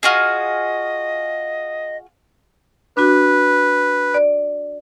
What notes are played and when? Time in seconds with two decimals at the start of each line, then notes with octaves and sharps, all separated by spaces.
0.03 F4 F#4 G#4 D#5
2.97 D4 F#4 B4
4.14 D5